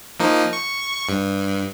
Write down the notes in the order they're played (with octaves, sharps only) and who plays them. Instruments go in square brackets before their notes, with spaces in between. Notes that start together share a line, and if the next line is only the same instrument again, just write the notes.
[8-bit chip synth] F3 A#3 D#4
C#6
G2